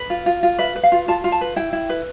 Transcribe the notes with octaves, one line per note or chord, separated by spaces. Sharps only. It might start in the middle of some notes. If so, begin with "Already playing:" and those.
Already playing: B4
F4
F4
F4
B4 E5
B4
F5
F4
F4 A5
F4
A5
B4
E4 G5
E4
B4